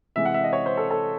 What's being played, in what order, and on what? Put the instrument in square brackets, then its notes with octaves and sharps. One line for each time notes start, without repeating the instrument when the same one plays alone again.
[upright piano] C3 E3 G#3 E5
F#5
E5
D#5
C#5
C5
A4
A4